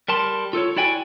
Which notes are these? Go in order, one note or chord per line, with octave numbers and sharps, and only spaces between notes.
G3 A#4 A5 C6
F4 A4 C5 C#5
E4 F#4 D5 G5 G#5